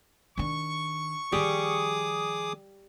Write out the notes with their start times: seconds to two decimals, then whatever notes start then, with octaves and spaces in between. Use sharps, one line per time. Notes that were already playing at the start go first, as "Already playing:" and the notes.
0.38 D#3 D4 C#6
1.32 D#3 F3 G3 G#4 D6 D#6